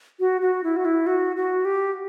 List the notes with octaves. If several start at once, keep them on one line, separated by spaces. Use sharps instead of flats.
F#4
F#4
E4
F#4
E4
F#4
F#4
G4